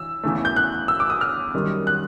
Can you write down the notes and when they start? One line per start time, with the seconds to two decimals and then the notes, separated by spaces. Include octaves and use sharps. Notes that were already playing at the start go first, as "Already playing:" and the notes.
Already playing: E3 E6
0.24 E2 C#3 E3 A3
0.45 G6
0.56 F#6
0.88 E6
1.00 D6
1.10 D#6
1.21 F6
1.54 F#2 D#3 G3
1.87 F#6